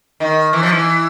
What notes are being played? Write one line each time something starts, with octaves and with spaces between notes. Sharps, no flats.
D#3
E3
F3
E3